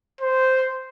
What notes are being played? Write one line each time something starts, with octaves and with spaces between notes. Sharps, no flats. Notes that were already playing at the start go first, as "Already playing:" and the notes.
C5